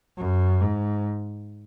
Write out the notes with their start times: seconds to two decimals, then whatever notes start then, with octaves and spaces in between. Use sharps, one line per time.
0.17 F#2
0.61 G#2